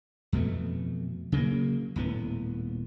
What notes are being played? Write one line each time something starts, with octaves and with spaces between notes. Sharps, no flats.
F2 B2 E3 A3
C#3 F#3 G#3 A#3
D#1 A2 B3